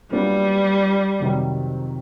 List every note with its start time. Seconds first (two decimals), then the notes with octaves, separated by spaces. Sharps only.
0.11 A#2 F#3 G3 B3 D4 F4
1.20 F2 C3 D#3 F#3